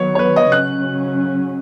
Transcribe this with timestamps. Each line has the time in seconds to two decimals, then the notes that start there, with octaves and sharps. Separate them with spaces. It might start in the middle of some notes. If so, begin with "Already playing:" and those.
Already playing: D#3 F#3 B3 C#5
0.15 C#5
0.19 B4
0.36 D#5
0.52 C#3 F#3 C#4 F#6